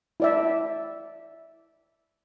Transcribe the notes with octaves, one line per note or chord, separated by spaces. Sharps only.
E4 D5 E5